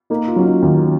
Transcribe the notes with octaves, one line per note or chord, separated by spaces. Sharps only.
A#3 D#4
F4
F#3 C#4
D#4
D#2 C#4